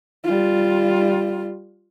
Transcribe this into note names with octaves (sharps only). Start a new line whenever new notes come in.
G3 F4